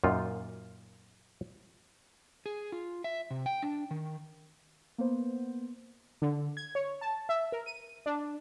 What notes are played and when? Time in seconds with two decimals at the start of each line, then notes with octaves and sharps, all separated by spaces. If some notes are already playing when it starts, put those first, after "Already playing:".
0.04 F#2 A#2 D#4 F4
2.46 G#4
2.72 F4
3.04 E5
3.31 C3
3.46 G5
3.63 D4
3.91 D#3
4.98 A#3 B3 C5
6.22 D3
6.57 G#6
6.75 C#5
7.01 A5
7.29 E5
7.52 A#4
7.66 D#7
8.06 D4